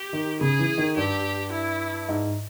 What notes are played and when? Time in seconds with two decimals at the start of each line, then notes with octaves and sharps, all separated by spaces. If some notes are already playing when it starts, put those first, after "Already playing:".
Already playing: G4
0.13 D#3
0.40 C#3 G#4
0.59 E3
0.78 D#3
0.97 G2 G4
1.52 E4
2.09 G#2